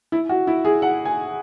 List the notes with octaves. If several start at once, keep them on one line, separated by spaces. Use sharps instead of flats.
E4
F#4
E4
G#4
F#5
G#5